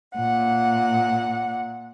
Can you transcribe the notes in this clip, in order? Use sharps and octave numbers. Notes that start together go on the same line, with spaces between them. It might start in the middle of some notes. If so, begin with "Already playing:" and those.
A#2 F#5